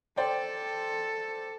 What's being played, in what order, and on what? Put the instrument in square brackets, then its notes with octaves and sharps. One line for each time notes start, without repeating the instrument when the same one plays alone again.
[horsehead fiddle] A4 [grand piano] C5 D5 G5